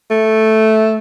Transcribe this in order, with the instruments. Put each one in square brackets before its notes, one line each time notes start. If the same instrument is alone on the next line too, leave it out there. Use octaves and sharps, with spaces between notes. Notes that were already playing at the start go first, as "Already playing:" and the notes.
[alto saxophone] A3